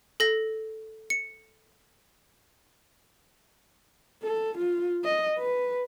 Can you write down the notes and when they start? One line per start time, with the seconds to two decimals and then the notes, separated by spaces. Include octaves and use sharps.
0.20 A4 A#6
1.10 C#7
4.24 A4
4.58 F4
5.04 D#5
5.39 B4